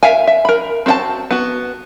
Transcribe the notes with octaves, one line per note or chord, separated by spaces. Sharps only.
A#4 E5 F5 G#5
E5
A#4 B5
C4 F#4 A4 G5 A5
B3 F#4